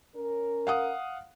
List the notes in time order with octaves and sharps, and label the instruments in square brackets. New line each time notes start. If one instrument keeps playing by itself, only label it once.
[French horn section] C#4 A#4
[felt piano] F5 F#5 D#6